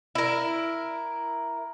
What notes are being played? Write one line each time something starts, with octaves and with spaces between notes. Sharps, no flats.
E4 A#4